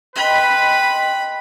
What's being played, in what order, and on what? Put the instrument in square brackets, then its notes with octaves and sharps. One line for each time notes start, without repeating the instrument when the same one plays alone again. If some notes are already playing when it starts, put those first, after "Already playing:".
[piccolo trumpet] B4 [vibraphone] D#5 G5 C6 [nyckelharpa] B5